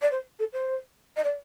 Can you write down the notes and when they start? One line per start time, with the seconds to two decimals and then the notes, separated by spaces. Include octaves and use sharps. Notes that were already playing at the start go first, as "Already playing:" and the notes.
0.02 D5
0.11 C5
0.39 A4
0.53 C5
1.16 D#5
1.24 D5